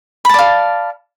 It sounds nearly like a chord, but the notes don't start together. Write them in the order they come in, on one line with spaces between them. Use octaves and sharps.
B5 A5 D5 F5